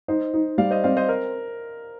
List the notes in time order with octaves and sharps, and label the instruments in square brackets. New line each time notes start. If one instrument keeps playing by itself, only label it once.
[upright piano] D#4 [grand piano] C5 D#5
[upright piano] D#4
[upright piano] G3 [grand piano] D5 F5
[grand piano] C5 D#5
[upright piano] C4 [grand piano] D5 F5
[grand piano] C5 D#5
A#4